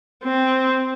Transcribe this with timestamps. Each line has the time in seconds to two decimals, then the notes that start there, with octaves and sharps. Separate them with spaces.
0.23 C4